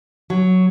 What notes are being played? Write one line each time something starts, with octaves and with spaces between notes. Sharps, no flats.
F#3